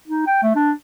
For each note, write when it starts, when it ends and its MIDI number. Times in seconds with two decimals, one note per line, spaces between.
0.08 0.25 63
0.27 0.41 79
0.43 0.54 57
0.56 0.72 62